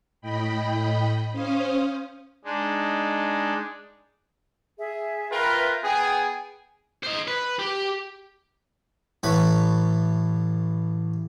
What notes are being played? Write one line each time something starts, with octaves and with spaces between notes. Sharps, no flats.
A2 D#5 G5 B5
C#4 C5 F5 D#6
G#3 D4 D#4
G#4 E5
F4 A#4 B4 E5 G5
B3 G#4 G5 G#5
C5 D#5
B4
G4
A1 A2 A3 B4 B5 C#6